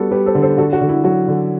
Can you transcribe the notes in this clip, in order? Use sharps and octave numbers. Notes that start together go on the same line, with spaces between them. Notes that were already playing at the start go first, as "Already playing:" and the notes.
Already playing: G3 B3 F#4 A4
G3 G4 B4
A4 C5
D3
A4 C5
D3 F#4 A4
F#4
D3
E4
F#3 F#4
D3